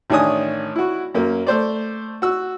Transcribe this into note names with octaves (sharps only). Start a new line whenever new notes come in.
A1 D#3 D4 C#5 G#5 D#6
E4 F#4
F#2 A#3
A3 C5 D5
F#4 E6